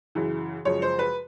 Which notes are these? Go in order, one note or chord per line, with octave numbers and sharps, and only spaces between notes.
F#2 C#3 E3
F#2 C#3 F3 G#3 C#5
C5
B4